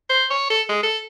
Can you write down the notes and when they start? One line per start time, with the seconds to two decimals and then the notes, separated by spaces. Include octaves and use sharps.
0.10 C5
0.30 C#5
0.50 A4
0.69 G#3
0.83 A4